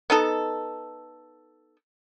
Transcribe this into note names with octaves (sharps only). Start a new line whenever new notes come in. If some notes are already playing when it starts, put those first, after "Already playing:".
B3 D#4 A4